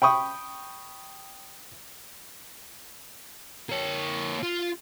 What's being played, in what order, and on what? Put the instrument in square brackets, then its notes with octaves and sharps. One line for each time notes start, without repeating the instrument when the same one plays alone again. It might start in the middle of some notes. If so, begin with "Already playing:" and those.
[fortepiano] G5 B5 C#6 D#6
[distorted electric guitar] A#3 C#5
F4